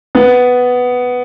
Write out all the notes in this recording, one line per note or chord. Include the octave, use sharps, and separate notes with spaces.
B3